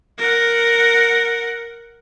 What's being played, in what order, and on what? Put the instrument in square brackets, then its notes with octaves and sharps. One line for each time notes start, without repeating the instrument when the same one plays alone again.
[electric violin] A#4 F#5